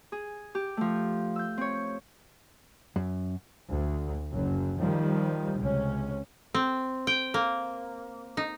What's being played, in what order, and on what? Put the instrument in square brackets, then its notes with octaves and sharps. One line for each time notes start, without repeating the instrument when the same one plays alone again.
[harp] G#4
G4
F3 A3
E6 G6
C4 C#5
[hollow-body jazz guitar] F#2
[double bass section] D2
F#1 F#2
D#3 F3 G3
C#2 C3 C#4
[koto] C4
G5
A#3
D#4